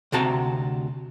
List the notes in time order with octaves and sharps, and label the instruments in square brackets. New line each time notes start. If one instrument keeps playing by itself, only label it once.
[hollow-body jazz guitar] D2 C3 F#4 A5 A#5